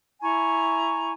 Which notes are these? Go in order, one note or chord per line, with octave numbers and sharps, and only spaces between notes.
E4 G#5 A#5 C#6